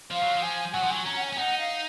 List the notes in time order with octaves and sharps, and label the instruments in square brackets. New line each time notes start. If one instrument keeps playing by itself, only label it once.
[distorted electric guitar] F3 [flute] F5
[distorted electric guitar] F#3
F3
[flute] G#5
[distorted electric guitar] F#3 [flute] F#5
[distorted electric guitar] F3
[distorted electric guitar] F#3 [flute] G#5
[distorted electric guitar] C#4 [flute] A#5
[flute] F#5
G#5
[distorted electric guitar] C#4 [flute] G#5
[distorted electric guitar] D#4 [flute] F#5
[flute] F5